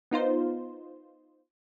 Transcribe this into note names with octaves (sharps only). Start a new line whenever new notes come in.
B3 D#4 F4 C5